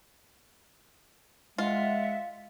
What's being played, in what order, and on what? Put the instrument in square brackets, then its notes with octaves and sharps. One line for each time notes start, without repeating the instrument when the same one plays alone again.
[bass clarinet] G#3 [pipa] F4 [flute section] E5 F#5